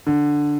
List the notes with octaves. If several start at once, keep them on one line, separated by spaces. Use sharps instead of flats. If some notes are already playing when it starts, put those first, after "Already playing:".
D3